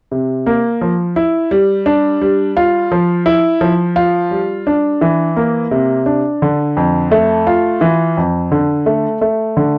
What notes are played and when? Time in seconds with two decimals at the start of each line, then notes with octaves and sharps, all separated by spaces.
0.11 C3
0.46 A#3
0.81 F3
1.16 E4
1.51 G3
1.86 D4
2.22 G3
2.57 F4
2.92 F3
3.26 E4
3.61 F3
3.96 F4
4.31 G3
4.67 D4
5.01 E3
5.36 A#3
5.71 C3
6.06 D4
6.42 D3
6.77 F2
7.11 A3
7.47 F4
7.81 E3
8.17 F2
8.52 D3
8.86 A3
9.21 A3
9.57 D3